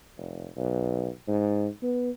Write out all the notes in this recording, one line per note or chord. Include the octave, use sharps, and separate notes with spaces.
F1
B1
G#2
B3